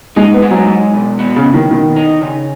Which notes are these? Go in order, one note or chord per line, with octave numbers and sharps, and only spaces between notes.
G#3 D#4
B3
G#3
F#3
G#3
B2
B3
C#3
B2
D#3
B2 D#3
D#4
C#3